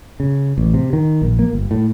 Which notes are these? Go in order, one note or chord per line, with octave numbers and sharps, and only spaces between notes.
C#3
A1
C3
D#3
A#1
A#3
G1
A2